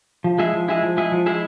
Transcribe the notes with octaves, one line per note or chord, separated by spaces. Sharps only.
F3
G#3 E4 G#4 E5
F3
G#3 E4 G#4 E5
F3
G#3 E4 G#4 E5
F3
G#3 E4 G#4 E5